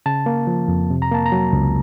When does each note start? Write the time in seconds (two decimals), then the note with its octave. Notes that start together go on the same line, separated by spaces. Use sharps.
0.06 C#3 A5
0.26 A#3
0.47 F3
0.68 F2
0.90 C3
1.02 A#5
1.12 A#3 A5
1.26 A#5
1.32 F#3
1.53 C#2